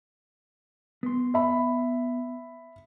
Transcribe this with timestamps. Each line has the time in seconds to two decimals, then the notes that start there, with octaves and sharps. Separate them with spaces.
1.03 B3 C6
1.34 E5 B5